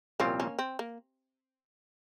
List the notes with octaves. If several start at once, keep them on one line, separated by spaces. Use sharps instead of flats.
C2 A#2 F3 A#3 C4 C#4 F4
A#3 C#4
C4
A#3